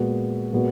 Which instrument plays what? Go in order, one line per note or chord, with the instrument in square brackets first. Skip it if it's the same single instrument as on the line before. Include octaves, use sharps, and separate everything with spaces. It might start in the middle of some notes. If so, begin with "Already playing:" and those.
Already playing: [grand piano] A#2 G#3 B3 F#4
A#2 G#3 B3 F#4